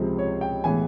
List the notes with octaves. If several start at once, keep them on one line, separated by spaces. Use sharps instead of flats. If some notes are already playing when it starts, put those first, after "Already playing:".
Already playing: C#2 C3 F3 G#3 C4
C#5
G5
A2 E3 G#3 B3 G#5